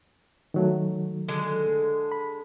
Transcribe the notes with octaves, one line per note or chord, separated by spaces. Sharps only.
D#3 F#3 A3
D3 G#3
B5